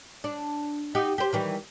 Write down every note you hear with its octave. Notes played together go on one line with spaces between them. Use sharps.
D4
D#4 F#4 G4
G4 C5
D#3 E3 G3